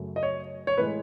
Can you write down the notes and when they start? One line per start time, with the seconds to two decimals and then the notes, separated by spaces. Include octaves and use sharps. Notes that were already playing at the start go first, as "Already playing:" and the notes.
Already playing: F#2 C#3 F#3 A3
0.16 D#5
0.23 C#5
0.67 C#5
0.77 A2 E3 G#3 B4